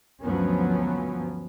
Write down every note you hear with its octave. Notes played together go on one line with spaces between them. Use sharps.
D2 G2 F3 F#3 B3 C#4